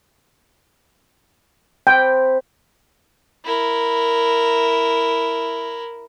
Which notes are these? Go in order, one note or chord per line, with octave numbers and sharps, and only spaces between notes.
C4 G5 B5
E4 A#4